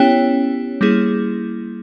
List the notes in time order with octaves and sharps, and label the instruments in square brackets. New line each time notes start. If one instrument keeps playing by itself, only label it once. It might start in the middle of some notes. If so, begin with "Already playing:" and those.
Already playing: [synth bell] B3 E4 G4 C#5 [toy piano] C#4
[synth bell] G3 A#3 E4 G#4